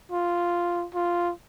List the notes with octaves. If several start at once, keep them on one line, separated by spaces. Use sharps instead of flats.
F4
F4